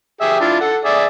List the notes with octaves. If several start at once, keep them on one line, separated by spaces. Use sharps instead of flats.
G4 G#4 E5
D4 E4 F4
A4 F#5
G#4 D5 E5